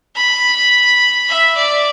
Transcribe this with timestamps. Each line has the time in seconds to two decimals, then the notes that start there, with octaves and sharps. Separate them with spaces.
0.16 B5
1.29 E5
1.57 D5